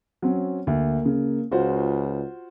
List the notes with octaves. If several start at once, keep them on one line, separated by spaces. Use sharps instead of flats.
F#3 C4 C#4
D2 A#3
C#3
C#2 F4 F#4 C5